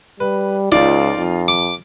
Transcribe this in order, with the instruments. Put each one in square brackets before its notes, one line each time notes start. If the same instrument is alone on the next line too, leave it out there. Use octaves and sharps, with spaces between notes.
[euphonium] G3 [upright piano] B4
[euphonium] C#2 [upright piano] D#4 F4 [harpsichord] D5
[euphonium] F2
[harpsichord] D6